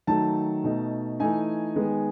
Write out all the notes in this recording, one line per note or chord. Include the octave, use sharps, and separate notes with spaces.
D#3 F#3 A3 A5
B2 A3 D#4
E3 A3 D#4 G#5
D#3 G#3 B3